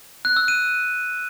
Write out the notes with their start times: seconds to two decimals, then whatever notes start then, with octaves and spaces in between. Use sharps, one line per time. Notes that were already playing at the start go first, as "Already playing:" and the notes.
0.25 F#6
0.37 E6
0.48 D#7